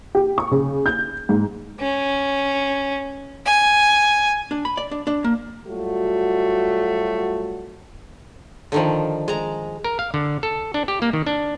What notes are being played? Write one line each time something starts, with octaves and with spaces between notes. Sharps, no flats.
G4
C#6
C#3
G6
G#2
C#4
G#5
D4
B5
D5
D4
D4
A#3
F#3 G3 A3 F4 F#4
D3 D#3 F3
G#3 A#5
A#4
F5
D3
A4
D4
G4
A#3
D#3
D4